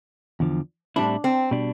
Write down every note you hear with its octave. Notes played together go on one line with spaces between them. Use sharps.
E2 D3 F3
A2 G3 C4 D4 E4
C4
B2 G3 D4